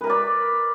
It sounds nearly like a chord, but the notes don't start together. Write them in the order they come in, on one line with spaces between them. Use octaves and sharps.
B4 A#4 B5 D5